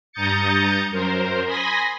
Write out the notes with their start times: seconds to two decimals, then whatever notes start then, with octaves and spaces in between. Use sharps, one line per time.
0.12 G2 A#5 D#6 G6 A6 C#7
0.90 F#2 A#4 C5
1.46 G#5 B5 C6 D#6 A#6